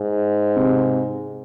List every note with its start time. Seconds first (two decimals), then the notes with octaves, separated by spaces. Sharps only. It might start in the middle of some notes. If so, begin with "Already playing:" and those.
Already playing: G#2
0.56 C3